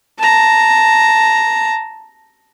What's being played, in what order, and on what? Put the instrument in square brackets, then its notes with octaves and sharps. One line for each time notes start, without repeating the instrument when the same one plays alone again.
[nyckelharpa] A5 A#5